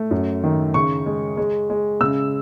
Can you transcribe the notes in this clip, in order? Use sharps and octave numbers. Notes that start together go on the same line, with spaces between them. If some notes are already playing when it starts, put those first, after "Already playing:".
Already playing: A3
F#2
D#3
C#3 C#6
G#3
G#3
G#3
C#3 E6